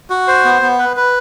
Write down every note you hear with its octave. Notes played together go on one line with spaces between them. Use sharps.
F#4
C5
B3
B3
B4
B4